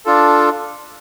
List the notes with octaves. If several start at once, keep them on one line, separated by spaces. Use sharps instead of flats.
D4 F4 A4